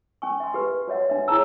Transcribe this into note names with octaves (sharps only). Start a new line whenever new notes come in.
C#4 G#5 C#6
E5 C6
G4 B4
F#4 C#5 D5 E5 F#5
D4 E5
E4 G#4 C#5 A5 A#5 E6